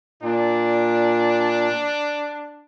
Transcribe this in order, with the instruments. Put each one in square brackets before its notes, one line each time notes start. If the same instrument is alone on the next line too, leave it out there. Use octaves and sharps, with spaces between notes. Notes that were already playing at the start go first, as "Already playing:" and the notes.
[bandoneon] A#2 [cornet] D4